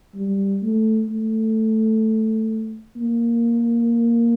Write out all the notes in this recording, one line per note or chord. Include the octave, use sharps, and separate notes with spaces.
G3
A3
A3
A#3